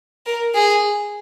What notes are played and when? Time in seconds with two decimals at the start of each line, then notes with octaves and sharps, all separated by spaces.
0.26 A#4
0.54 G#4